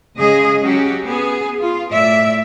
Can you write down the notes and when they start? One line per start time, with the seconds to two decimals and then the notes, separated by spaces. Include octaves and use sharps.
0.17 C#3 G#3 G#4 D#5
0.60 F#3 C#4 F#4 G4
1.04 B3 G#4
1.60 F4
1.90 A2 D5 E5